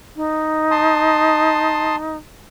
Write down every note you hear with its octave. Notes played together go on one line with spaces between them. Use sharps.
D#4
A5 C6 D#6